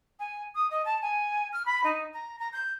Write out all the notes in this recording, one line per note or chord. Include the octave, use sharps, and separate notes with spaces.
G#5
D#6
D#5
A5
G#5
F6
B5
D#4
A#5
A#5
G6